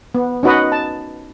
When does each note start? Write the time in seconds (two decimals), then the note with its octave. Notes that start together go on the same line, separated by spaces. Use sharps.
0.15 B3
0.43 C#4 D#4 F#4 B4 D#5
0.72 A5